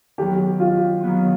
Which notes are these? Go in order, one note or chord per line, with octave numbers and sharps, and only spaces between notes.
D#3 F#3 B3 G4
F4
D#3 F#3 B3